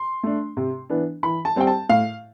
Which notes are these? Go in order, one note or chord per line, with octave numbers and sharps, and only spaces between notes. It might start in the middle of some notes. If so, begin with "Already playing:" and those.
Already playing: C6
A3 D4
C3
E3 B3 D4
E3 B5
A5
G3 C4 G5
A5
A2 F5